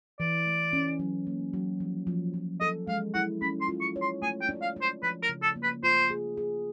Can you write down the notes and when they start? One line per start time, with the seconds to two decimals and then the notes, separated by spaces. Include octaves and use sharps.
0.20 E3 D5
0.46 A3
0.73 C#4
0.99 F#3
1.27 A#3
1.53 F#3
1.80 F3
2.07 F3
2.34 F3
2.60 A4 D#5
2.87 G#3 F5
3.14 E4 F#5
3.42 C#4 B5
3.61 C6
3.68 F4
3.81 C#6
3.96 C#5
4.02 C6
4.22 A3 G#5
4.42 G5
4.49 D4
4.62 F5
4.76 D4
4.82 C5
5.03 F3 B4
5.23 A#4
5.29 C#3
5.43 A4
5.56 A#3
5.63 B4
5.83 F4 C5
6.10 G#4
6.37 G#4